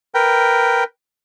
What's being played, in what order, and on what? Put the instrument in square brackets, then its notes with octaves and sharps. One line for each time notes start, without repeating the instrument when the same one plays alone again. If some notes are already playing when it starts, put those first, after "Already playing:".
[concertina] A#4 B4 G5